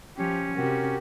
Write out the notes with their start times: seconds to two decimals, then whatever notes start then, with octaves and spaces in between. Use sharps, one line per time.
0.17 F3 C#4 G4
0.56 C3 F#4 G4 A#4